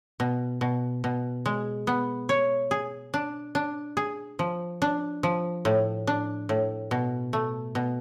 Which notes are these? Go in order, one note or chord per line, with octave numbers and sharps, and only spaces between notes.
B2
B2
B2
G#3
B3
C#5
G#4
D4
D4
G#4
F3
D4
F3
A2
D4
A2
B2
A3
B2